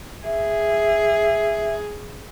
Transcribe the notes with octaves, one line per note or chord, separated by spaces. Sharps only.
G#4 E5